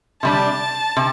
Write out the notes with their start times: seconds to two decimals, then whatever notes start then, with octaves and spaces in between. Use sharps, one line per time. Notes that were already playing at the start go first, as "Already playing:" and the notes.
0.23 C3 G3 D4 A5
0.97 C3